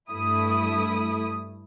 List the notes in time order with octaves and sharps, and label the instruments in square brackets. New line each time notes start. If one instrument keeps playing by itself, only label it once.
[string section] G2 A3 E4 D#6